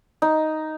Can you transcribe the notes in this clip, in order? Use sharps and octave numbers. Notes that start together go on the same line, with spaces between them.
D#4